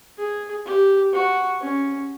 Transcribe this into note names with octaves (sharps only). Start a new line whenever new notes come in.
G#4
G4
F#4
C#4